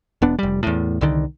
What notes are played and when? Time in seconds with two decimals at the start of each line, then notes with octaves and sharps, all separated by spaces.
0.22 E1 B3 D4
0.39 F1 G3
0.63 E2 A2
1.01 C2 D3 D#3